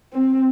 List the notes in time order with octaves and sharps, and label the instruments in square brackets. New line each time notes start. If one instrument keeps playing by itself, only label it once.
[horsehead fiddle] C4